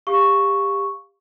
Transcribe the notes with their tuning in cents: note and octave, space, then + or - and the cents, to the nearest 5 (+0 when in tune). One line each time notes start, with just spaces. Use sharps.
G4 +25 F5 +0 C#6 +0